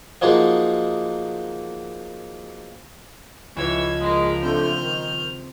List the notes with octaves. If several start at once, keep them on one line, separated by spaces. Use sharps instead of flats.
F3 F#3 G#3 A#3 D#4
C#2 E3 F3 C#5 E6 G#6
G#3 E4 A#4
D3 A3 C4 F6 G6
D#3